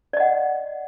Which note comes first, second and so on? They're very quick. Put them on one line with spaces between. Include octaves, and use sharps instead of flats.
D5 D#5 F#5